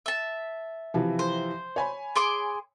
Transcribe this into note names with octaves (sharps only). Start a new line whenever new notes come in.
E5 A5
C3 E3 F3
C5
C#5 G#5 B5
G#4 C6 D6